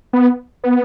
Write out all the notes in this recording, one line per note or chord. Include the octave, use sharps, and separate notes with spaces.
B3
B3